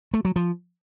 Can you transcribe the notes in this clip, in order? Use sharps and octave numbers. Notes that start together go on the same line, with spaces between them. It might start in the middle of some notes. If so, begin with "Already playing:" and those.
A3
F#3
F3